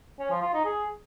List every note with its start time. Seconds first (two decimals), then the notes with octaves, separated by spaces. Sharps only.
0.19 C#4
0.31 F3
0.42 F4
0.53 D#4
0.65 G#4